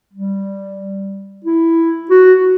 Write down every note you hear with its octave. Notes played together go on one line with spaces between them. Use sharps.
G3
E4
F#4